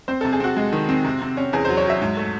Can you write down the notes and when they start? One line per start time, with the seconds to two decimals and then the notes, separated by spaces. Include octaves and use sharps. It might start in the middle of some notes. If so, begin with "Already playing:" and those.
0.08 C4 C5
0.21 A4
0.25 C3
0.33 G#4
0.40 C4 F#4
0.56 G#3
0.72 D#3
0.89 C4
1.04 C3
1.21 C3
1.37 C#4
1.53 E2 G#4
1.65 C5
1.69 F#3
1.77 C#5
1.86 F#3 E5
2.02 G#2
2.17 A3